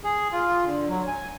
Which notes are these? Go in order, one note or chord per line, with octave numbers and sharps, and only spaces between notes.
G#4
F4
D3
F#3
G#5